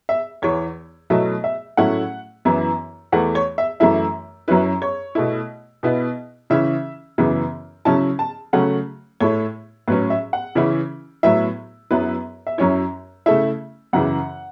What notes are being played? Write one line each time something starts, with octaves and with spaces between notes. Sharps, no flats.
E5
E2 E3 B3 C#5
B2 F#3 A3 E4 E5
E5
A2 F#3 A3 C#4 E4 F#5
F#2 E3 B3 E4
E2 E3 A3 F#5
C#5
E5
F#2 E3 A3 E4 E5
F#2 F#3 C#4 E4 B4
C#5
B2 A3 E4
B2 B3 E4
C#3 E3 C#4 E4 E5
F#2 C#3 E3 B3
C#3 F#3 C#4 E4 A5
A5
C#3 F#3 A3 C#4 F#5
A2 A3 E4 C#5
A2 F#3 C#4 B4
E5
F#5
C#3 E3 C#4 E4
A2 F#3 B3 E4 E5
F#2 F#3 B3 E4 B4
E5
F#2 F#3 C#4 E4 C#5
C#3 A3 E4 E5
F#2 C#3 E3 F#5